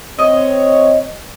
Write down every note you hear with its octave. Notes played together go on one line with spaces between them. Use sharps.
C4 C#5 D#5